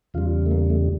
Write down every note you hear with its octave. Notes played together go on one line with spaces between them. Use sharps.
E2 C#3 G3 F4
A3
A#3
A3